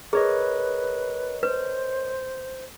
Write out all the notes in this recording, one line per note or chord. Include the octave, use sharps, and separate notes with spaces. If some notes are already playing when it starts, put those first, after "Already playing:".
G#4 A#4 B4 C#5 D#5
B4 C5